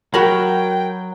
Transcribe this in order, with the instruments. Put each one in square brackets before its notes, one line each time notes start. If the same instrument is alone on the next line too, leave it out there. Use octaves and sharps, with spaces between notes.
[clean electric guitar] F#3 [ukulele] F#4 A#4 B5 [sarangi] G5